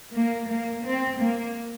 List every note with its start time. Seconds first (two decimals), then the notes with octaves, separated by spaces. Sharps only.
0.12 A#3
0.48 A#3
0.85 C4
1.21 A#3